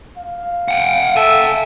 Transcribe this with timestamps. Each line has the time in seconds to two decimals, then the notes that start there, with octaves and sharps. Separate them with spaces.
0.17 F5
0.68 F#5 G5
1.16 A4 E5 G5 G#5